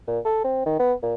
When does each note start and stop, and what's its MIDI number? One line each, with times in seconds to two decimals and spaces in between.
0.08 0.19 46
0.25 0.40 69
0.44 0.63 60
0.66 0.78 51
0.79 0.93 59
1.03 1.14 46